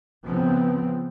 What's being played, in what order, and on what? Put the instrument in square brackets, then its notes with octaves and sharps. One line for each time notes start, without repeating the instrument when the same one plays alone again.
[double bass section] C#3 F3 B3 C4